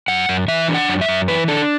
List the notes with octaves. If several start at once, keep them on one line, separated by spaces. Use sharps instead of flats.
F#2 F#5
F#2
E3 E5
D4
F#5
F#2
E5
F#2
E3 B4
D4 A4